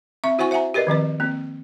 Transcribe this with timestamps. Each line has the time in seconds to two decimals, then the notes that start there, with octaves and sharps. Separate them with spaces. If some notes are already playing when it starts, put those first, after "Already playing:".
0.24 C4 E5 C#6
0.38 E4 F#4 C5 F#5 G#5 C#6
0.51 C5 E5 F#5 G#5 A#5
0.74 G4 A#4 B4 D5 D#5
0.87 D#3 F3 C4 B4
1.20 A#3 C4